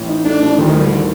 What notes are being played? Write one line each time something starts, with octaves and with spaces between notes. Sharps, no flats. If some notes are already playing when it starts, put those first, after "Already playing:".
Already playing: A1
D#4
A3 D4
A2
D2 D#3
G3
D3
D#3